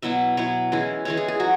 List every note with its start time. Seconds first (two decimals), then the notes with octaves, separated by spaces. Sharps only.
0.02 B2 F#3 E4 E5
0.37 B2 F#3 E4 C#5
0.72 E3 G#3 C#4 E4
1.05 E3 G#3 C#4 E4 C#5
1.17 G#4
1.28 G#4
1.40 F#3 F#4